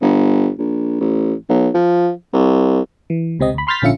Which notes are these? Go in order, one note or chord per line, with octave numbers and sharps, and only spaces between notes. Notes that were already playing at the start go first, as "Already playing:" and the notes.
G1
A#1
A1
B1
F3
C2
E3
C#2 C3 C4 D#5
D2 B5
B5 C6 F6 G6 A6 B6
A#1 D3 C#4 F4 E5 C#7